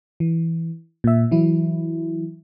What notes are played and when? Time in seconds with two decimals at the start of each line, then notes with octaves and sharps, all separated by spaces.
0.20 E3
1.04 A#2 E5
1.31 E3 F#3 E4